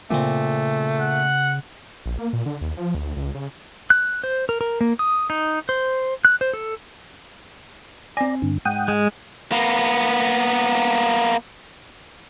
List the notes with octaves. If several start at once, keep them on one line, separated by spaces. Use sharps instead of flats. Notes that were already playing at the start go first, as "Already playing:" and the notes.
A#2 C#3 A3 C4
F#5
A#1
A#3
A#2
D3
D#2
F3
D2
C#2
C#3
F#6
C5
A#4
A#4
A#3
D#6
D#4
C5
F#6
C5
A4
C4 D5 G#5 A#5
G2 D3
G#2 F#5 G5 D#6
G#3
A#3 B3